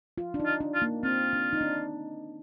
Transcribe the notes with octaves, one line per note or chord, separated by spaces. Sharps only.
F4
D4
D#4
F4
D4
F4
A#3
C4 F4
D4
D#4
D4